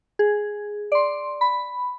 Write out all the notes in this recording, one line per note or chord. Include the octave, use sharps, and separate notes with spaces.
G#4
D5 C6
B5